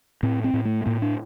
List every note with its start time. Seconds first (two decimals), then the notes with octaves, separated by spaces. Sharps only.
0.23 A2 C4
0.44 C4
0.54 A2
0.65 A3
0.86 A2 A#3
1.02 D4